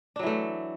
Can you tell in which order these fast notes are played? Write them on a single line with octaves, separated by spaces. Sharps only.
D4 F#3 E3 A3